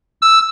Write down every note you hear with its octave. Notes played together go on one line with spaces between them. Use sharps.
E6